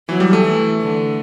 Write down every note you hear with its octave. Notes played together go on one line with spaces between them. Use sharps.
E3 F#3
G3
A3
E3
D3